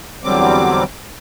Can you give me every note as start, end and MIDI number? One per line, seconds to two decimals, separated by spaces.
0.24 0.84 40
0.24 0.84 50
0.24 0.84 54
0.24 0.84 55
0.24 0.84 60
0.24 0.84 86